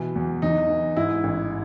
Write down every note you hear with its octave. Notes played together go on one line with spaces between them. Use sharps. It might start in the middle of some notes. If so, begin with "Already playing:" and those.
Already playing: B2 E3
E2
E2 D#4
E3
G#2 E4
A1